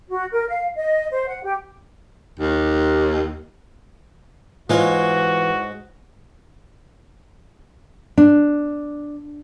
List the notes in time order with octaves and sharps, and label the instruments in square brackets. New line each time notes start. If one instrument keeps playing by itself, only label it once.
[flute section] F#4
A#4
F5
D#5
C5
F#5
G4
[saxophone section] D#2
[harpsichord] G#2 G#3 C#5 [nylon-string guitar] E3 F4 [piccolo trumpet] F#4
[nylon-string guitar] D4